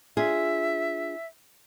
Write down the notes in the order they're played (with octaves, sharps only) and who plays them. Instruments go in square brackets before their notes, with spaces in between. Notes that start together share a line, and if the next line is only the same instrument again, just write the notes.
[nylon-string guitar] D4 F4 G#4 [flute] E5